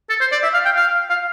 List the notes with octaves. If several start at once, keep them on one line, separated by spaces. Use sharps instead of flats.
A4
C5
D5
E5
F5
G5
F5
F5